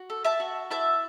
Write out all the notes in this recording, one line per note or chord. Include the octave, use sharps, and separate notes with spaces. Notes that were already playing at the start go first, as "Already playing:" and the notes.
Already playing: F#4
A4
E5 A5
F#4
E4 E5 A5